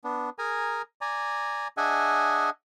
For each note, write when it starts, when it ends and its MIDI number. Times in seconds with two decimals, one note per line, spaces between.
0.04 0.30 59
0.04 0.30 62
0.39 0.82 68
0.39 0.82 70
0.39 0.82 80
0.39 0.82 82
1.01 1.68 74
1.01 1.68 80
1.01 1.68 82
1.77 2.50 62
1.77 2.50 68
1.77 2.50 75
1.77 2.50 76
1.77 2.50 78
1.77 2.50 80